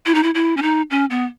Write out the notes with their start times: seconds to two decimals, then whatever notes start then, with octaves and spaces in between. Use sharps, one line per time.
0.06 E4
0.15 D#4
0.23 E4
0.35 E4
0.57 C#4
0.62 D#4
0.91 C#4
1.10 B3